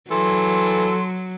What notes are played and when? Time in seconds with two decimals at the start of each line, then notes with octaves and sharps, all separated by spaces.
0.10 E3 F#3 A4 C6